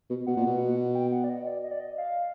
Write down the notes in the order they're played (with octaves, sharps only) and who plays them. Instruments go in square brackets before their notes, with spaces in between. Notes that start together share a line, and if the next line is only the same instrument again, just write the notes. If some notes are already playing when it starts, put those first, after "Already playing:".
[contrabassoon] B2
[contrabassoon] B2 [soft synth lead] F#5
[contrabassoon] A#2
B2
[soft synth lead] G5
F#5
D5
D#5
D5
D#5
D5
D#5
F5